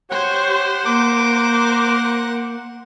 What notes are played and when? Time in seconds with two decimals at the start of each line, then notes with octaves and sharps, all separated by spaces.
0.10 G4 C5 C#5 F#5
0.86 A#3 A#4 C5 D6